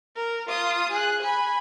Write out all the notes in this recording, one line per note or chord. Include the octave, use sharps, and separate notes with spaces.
A#4
F4 D#6
G#4 F#6
G#5 B5